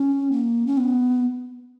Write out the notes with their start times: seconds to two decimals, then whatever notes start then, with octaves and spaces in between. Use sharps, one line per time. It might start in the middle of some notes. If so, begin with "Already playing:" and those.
Already playing: C#4
0.32 A#3
0.67 C#4
0.78 B3